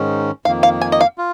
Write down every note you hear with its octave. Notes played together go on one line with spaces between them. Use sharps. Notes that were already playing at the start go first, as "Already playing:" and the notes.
Already playing: G#2 D#3 C#4
F2 D#3 A#3 F5
F5
G#5
D#5
F5
F4